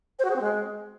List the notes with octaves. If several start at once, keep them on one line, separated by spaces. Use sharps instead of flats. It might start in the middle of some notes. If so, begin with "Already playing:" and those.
C5
F#4
G#4
C4
G#3